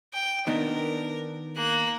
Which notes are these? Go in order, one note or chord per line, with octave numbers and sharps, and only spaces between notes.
G5
D#3 B3 D4 A#4
A#3 F#6